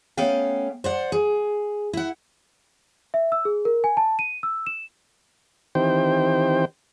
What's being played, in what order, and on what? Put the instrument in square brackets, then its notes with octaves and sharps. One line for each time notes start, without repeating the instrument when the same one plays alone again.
[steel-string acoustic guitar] A3 B3 C#4 F5 G5
C5 D5 F#5
G#4
E4 F#5
[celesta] E5
E6
G#4
A#4
G#5
A5
D#7
E6
E7
[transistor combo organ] D#3 E3 C4 G4 C5 G5